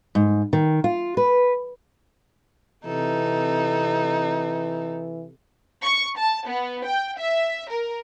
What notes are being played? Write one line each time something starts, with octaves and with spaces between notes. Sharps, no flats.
G#2
D#3
F4
B4
C3 E3 C4 D#4 A4
C#6
A5
B3
G5
E5
A#4